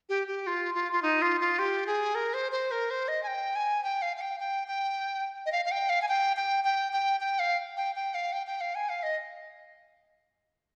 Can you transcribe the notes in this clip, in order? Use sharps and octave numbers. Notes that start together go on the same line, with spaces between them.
G4
G4
F4
F4
F4
D#4
F4
F4
G4
G#4
A#4
C5
C5
A#4
C5
D#5
G#5
G5
G#5
G5
F5
F5
G5
G5
G5
D#5
F5
F5
G5
F5
G#5
G5
G5
G5
G5
G5
F5
G5
G5
F5
G5
G5
F5
G#5
F5
D#5